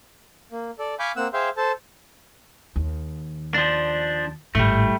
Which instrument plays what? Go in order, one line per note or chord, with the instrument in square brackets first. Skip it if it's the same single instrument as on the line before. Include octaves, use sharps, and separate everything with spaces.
[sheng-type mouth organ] A#3
A4 D5
F5 G#5 B5 C#6 D6 G6
A#3 C4 F#5 E6
G#4 C5 E5 F5 G5 C6
A4 C5 A5
[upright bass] D#2
[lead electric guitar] F3 D4
[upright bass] G#1 A2 [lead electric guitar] G3 A3